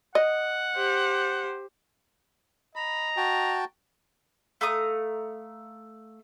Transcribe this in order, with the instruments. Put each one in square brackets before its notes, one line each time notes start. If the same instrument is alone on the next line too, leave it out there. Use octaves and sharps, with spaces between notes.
[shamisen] D#5 [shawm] F#5
[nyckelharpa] G4 C5
[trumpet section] D#5 A#5 [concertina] B5
[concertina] F#4 G5 A5
[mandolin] A3 F5 A#5 D#6